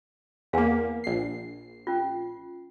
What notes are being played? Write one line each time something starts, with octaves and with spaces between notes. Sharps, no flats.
E2 A#3 F5 F#5 G#5
A#1 C7
C#4 F4